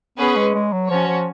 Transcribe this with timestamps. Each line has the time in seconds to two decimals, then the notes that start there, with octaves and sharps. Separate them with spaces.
0.18 B3 C#4 G#4 B4
0.36 G#3
0.54 G#3
0.73 F#3
0.90 F3 C#4 F#4 C#5
1.08 F3